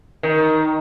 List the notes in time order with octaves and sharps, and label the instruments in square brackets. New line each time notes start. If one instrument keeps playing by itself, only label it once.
[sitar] D#3